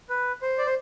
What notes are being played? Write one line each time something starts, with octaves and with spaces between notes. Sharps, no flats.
B4
C5
D5
C5